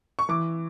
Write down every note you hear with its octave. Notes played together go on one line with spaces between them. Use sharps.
C#6
E3 D6